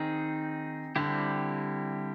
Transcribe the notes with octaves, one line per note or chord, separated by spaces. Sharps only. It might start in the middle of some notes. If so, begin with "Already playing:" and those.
Already playing: D#3 C4 D#4 G#4
D3 G3 C4 E4 G4